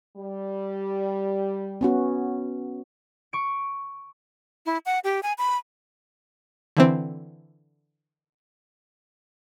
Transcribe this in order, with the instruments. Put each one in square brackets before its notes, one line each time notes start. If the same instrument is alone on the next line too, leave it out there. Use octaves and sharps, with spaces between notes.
[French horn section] G3
[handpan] B3 C#4 F#4
[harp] C#6 D7
[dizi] E4
F#5
G4
G#5
B5
[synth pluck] D3 E3 C4